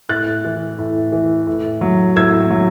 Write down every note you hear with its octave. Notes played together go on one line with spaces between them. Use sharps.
A2 F#6 A6
E3
A2
E3
A2
F#3
A2 E6 G#6
F#3